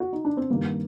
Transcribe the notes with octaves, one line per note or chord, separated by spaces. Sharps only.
F#4
D#4
D4
C4
G2 D#3 G3 A#3